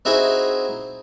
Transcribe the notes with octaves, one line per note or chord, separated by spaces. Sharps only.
C4 D#4 E4 F#4 G#4